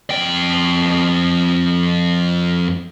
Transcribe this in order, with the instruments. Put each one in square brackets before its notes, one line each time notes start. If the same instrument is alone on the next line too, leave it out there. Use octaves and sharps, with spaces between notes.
[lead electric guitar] F2 G5